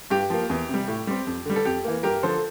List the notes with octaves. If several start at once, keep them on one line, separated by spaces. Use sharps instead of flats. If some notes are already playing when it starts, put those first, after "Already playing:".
G2 G4
F3 A#3
E2
C3 G3
A2
G3 C4
F2
D3 G3
A4
F2 G4
E3 A#3
G2 G4 A#4
D3 F3 A4 C5